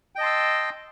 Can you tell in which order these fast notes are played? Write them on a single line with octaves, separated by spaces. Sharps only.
G5 D#5 A5 C6 E6